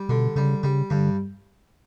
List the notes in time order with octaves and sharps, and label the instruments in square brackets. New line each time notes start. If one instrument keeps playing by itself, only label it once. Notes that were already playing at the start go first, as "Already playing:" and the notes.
Already playing: [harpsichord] G3
[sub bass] B2 [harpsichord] D3
[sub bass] C#3 [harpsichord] G3
[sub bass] C#3 [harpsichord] G3
[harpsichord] G2 [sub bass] D3